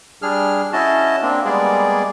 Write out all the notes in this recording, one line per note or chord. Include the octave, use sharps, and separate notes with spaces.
G3 D4 G#4 F6
C#4 E4 F#4 D#5 A5
A#3 C4 D4
G3 G#3 A#3 B3 G#4 D5